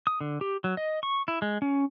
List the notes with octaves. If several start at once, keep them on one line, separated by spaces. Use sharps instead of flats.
D#6
D3
G4
F#3
D#5
C#6
E4
G#3
C#4